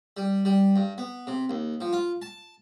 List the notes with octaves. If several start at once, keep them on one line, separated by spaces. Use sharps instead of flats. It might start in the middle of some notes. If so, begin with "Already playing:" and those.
G3
G3
G2
B3
C3
D#2
F3
F4
A5